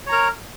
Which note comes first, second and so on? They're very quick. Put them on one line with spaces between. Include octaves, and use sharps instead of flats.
C#5 A#5 A#4